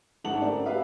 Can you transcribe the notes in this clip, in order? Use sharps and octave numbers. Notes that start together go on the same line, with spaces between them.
G1 G#2 A3 F#5 A5 F#7
C4 C#4 A#4 D5
F#4 G4 B4 E5 F5